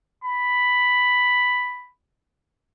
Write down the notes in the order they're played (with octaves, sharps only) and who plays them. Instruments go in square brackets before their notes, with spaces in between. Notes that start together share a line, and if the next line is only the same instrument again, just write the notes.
[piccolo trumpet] B5